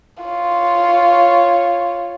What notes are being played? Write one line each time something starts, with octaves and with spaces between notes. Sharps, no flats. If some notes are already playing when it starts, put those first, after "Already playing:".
F4 C#5